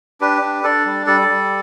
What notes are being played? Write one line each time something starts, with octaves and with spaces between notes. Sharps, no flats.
D4 G4 B4
D4
D4 A4 D5
G3
G3 A4 D5
G3